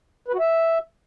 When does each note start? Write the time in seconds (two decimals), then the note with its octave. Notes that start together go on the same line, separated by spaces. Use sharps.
0.28 B4
0.34 F#4
0.39 E5